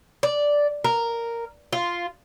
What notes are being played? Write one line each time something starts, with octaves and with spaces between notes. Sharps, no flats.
D5
A#4
F4